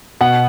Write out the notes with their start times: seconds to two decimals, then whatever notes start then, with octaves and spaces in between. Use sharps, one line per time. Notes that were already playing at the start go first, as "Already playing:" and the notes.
0.21 B2 F#5